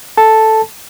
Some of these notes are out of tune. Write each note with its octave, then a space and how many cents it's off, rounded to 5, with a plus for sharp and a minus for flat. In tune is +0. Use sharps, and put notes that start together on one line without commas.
A4 +0 A5 +0